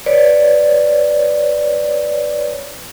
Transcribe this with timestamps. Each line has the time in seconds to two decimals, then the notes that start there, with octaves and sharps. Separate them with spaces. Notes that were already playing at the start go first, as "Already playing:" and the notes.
0.06 B4 C#5 D5